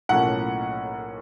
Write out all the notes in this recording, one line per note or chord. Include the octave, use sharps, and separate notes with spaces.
B1 A2 F3 A#3 C#4 F#5